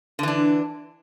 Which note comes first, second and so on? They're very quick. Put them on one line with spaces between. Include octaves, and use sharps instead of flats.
D3 E3 D4